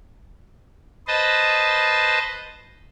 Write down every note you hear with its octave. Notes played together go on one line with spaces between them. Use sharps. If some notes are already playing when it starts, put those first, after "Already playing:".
B4 C5 D#5 A5